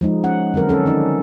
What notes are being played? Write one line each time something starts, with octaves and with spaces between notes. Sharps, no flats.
F3 G#3 D#4
C#4 F#5
D3 F#3 C4 A#4 B4
C#4 A4
D#3 C#4 D#4 D5